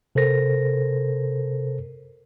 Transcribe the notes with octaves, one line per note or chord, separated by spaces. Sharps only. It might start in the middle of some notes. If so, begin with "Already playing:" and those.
C3 A4 A#4 C5 A#6